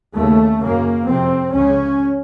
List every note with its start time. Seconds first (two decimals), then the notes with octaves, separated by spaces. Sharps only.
0.16 D#2 C#3 A3
0.62 F#2 C#3 A#3
1.08 F2 C3 C4
1.54 C#2 C#3 C#4